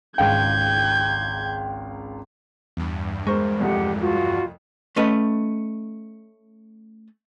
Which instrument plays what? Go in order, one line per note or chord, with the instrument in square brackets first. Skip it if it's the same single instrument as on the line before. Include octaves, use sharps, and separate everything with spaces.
[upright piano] G#1 C#2 F5 [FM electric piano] G5 [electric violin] G6 G#6
[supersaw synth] E2 G2
[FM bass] G#3 [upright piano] A#4 C5 C#6
[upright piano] C2 F2 A3 [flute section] G4 F#5
[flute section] F4 F#4
[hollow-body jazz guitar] A3 C#4 B4 D#5